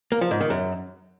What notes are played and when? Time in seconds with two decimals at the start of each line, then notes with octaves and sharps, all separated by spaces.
0.12 A#3
0.21 F3
0.31 G#2
0.41 D#3
0.50 F#2